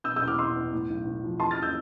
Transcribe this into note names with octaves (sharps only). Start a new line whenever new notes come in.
B2 E6 G6
E6 G6
E2
D6 F6
B2 C6 E6
E2
A2
B1
B1
F3
E2 A5 C6
F6 A6
E6 G6